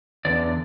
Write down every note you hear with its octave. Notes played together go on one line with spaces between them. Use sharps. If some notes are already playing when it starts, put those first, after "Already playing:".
E2 D3 D5